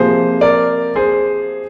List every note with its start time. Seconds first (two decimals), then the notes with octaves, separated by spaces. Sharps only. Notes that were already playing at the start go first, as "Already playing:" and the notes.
Already playing: C3 F3 A#3 G#4 C5
0.41 A#4 D5
0.96 G#4 C5